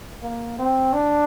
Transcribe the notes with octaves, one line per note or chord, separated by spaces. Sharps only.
A#3
C4
D4